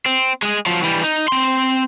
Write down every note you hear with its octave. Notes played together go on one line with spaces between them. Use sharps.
C4
G#3 G#4
F3 F#3
E3 G3
D#4
C4 C6